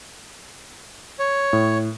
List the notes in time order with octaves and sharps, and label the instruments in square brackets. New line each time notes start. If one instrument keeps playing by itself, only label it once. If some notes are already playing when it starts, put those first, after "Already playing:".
[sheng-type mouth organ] C#5
[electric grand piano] A2